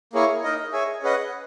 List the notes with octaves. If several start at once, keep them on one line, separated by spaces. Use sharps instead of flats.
A#3 E4 G#4 C#5
D#4 A#4 D#5
G#4 C#5 E5 G#5
C#4 G#4 B4 D#5 F#5